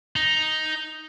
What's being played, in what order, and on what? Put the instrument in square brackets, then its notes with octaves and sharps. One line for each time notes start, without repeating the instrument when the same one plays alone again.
[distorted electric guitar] D#4